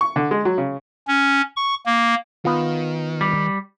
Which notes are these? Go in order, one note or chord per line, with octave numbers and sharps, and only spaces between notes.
C#6
D3
G#3
F#3
C#3
C#4
C#6
A#3
D#3 B3 F4
G3